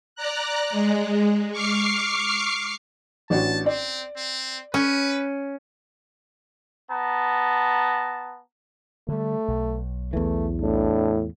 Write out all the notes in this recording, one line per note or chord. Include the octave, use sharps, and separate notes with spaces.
D5 A#5 F#6
G#3
C#6 D6 F6 C7
A1 D4 F#4 A5
C4 D5
C4
C#4 B4
B3 A5 A#5
D3 G3 A3
B1
E2 E3 A3
A2 D4